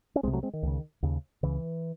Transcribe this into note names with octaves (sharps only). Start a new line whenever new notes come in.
C#4
C2 C3 G#3 C4
F#3 A3
G#3 C4
D#3
C#2 C#3
D#2 C#3
C#2 C#3 E3